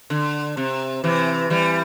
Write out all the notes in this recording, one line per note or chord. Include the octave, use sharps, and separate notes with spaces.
D3
C3
C3 E3
E3 G3